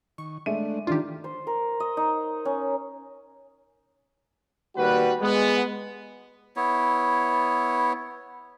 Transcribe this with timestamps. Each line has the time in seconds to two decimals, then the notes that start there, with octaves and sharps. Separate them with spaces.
0.18 D#3 C#6
0.46 G#3 A3 D4 E5 D#7
0.87 D#3 D4 F4 G4
1.24 C5
1.47 A#4
1.80 D#5
1.97 D#4
2.45 C#4
4.77 D#2 G3 F#4 B4
5.21 G#3 B3
6.56 B3 E4 C#5